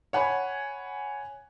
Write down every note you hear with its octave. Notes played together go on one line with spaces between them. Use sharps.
C#5 F#5 G#5 B5